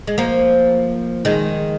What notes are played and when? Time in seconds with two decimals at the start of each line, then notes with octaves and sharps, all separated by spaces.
0.07 G#3
0.18 F3 A#3
1.25 D#3 G#3